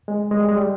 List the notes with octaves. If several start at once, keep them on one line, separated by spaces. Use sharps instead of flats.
G#3
G#3
G3
G#3
G3